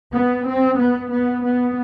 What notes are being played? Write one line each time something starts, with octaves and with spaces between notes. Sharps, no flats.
B3
C4
B3
B3
B3